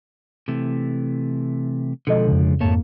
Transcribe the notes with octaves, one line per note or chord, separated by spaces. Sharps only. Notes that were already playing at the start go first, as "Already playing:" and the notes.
C3 E3 A3
B2 D3 F3 G#3 A4 D#5
F2 C#3
F2 G#2 A3 A#3 C#5 A5